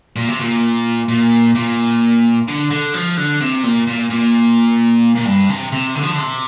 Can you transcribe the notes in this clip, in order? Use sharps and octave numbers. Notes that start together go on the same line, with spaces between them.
A#2
C3
A#2
A#2
A#2
D3
D3
F3
D3
C3
A#2
A#2
A#2
A#2
G2
C3
C3
D3
F3
D3
C3